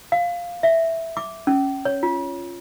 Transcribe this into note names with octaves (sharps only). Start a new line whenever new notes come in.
F5
E5
D6
C#4
C#5
F4